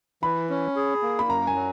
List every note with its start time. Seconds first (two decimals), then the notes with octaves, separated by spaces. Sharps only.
0.23 E3 B5
0.50 C#4
0.76 G#4
1.02 A#3
1.19 B5
1.29 F#2 A#5
1.47 G#5
1.56 F#3